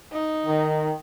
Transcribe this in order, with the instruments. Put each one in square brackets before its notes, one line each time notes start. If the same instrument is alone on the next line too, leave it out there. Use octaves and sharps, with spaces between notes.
[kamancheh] D#4
[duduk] D#3